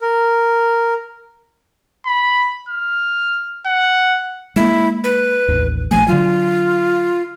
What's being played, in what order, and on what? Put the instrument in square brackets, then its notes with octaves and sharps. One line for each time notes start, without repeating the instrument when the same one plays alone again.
[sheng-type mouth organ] A#4
[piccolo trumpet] B5
F6
F#5
[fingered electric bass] G#3 A#3 [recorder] E4
[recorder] B4
[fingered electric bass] A1 D#2
[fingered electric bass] A#1 F3 A3 [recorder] G#5
[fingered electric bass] D3 F#3 [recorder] F4